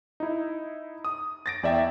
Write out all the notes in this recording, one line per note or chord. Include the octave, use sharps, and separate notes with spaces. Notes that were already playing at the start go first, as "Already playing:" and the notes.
D#4 E4
D#6
A6 A#6 D7
E2 D5 E5 G5